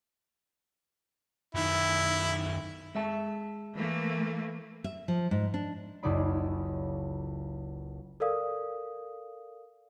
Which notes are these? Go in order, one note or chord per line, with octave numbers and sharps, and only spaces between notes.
F#2 D#3 E4
G#3 E5 A5
E3 A3 A#3
E5
F3
G#2
D4
F#1 C#2 D#4 D5 B5
A4 A#4 D5 F5 D#6